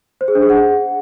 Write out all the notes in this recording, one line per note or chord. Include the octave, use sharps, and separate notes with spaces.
C5
G#4
D4
G#4
F#5